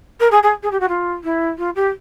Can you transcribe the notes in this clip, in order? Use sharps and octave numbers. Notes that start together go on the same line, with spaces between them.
A#4
G#4
G#4
G#4
G4
F#4
F4
E4
F4
G4